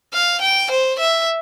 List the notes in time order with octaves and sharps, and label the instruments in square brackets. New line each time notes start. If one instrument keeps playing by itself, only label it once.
[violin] F5
G5
C5
E5